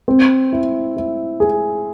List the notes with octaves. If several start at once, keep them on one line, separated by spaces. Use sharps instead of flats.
C4
E4
E4
G#4